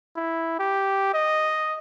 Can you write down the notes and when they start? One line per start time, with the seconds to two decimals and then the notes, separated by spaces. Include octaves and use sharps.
0.16 E4
0.59 G4
1.14 D#5